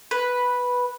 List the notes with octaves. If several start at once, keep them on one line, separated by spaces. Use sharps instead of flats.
B4